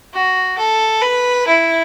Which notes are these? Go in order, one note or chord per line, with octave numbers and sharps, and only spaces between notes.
F#4
A4
B4
E4